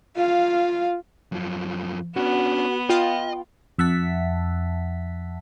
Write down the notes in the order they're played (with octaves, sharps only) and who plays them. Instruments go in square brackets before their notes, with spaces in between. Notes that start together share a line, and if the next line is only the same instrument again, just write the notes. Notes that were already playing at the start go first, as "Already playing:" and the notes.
[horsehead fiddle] F4 F5
[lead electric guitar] F#2 F3
[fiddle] B3 [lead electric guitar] C#4 D4 [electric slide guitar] F#4
[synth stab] F4 [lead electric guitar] D#5 [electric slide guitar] G5
[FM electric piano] F2 E5 F#5 A5 B6